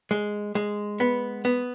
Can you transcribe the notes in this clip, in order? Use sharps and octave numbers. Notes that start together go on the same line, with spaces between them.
G#3
G#3
B3
B3